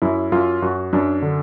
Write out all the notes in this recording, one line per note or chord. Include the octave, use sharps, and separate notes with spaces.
F#2 E4
F#2 F4
F#2 F#4
F#2 D4
D3